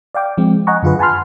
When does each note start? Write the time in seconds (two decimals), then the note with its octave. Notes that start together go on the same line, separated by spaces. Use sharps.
0.15 D5 F5 G5 D6
0.38 F3 G#3 C4
0.67 D#5 F#5 G#5 A#5 C#6
0.83 F#2 D3 F4 G#4 B4
0.99 F#5 G#5 A5 B5 C6 F6